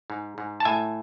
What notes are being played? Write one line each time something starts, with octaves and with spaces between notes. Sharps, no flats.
G#2
G#2
A5
A2 E5 G#5